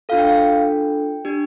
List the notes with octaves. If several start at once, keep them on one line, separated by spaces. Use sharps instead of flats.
D4 F4 A4 F5
G5
F5
G5
D4 G4